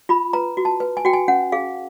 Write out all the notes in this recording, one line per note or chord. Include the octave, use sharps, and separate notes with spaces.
F4 B5
B4 A#5
F#4
A5
B4
G#5
F#4 G5
G#5
C#4 F#5
G#4 F5